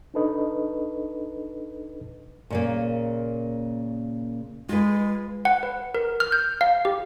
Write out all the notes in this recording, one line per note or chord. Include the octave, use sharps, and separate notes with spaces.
D4 D#4 A4 B4 D#5
A#2 C#3 A#3
G#3 F4 B4
F#5
B4
A#4
F6
G6
F5
G4